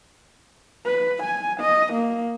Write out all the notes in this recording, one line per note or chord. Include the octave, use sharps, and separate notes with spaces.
B4
G#5
D#5
A#3